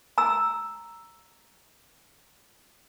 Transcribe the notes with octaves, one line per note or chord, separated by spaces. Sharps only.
A#5 E6